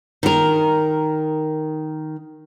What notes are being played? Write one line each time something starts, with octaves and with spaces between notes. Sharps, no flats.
D#3 A#4